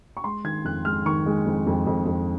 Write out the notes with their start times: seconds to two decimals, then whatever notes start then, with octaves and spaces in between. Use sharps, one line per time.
0.17 C#6
0.24 G#3 C6
0.44 D#3 G#6
0.65 F2 F#6
0.85 G#3 F6
1.05 D#3 C#6
1.26 G#3
1.46 F2
1.67 F2
1.87 F2
2.06 F2